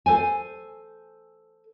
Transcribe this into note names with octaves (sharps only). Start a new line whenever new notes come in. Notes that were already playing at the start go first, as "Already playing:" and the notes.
A4 C5 G#5